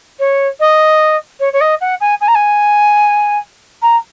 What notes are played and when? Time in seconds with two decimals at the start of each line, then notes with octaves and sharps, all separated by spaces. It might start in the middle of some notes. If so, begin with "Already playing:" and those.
0.19 C#5
0.60 D#5
1.40 C#5
1.53 C#5
1.61 D#5
1.81 F#5
2.00 G#5
2.21 G#5
2.28 A#5
2.35 G#5
3.82 A#5